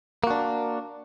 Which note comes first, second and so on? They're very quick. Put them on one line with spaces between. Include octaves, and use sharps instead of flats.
A#3 F#4 D4